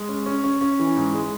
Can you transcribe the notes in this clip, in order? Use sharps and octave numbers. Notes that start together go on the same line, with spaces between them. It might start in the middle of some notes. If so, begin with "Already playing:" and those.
Already playing: G#3
C#4
C#4
C#4
C#4
E3
G#2
G#3